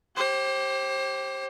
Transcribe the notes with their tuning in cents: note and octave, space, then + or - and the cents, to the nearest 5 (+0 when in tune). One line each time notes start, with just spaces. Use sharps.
G4 -10 C5 +35